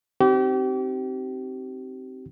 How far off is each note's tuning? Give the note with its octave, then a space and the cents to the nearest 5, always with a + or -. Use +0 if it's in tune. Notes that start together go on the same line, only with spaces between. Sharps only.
C4 +0 D#4 -10 G4 -35